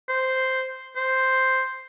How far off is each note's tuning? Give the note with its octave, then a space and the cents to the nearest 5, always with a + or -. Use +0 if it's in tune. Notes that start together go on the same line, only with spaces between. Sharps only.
C5 -5
C5 +0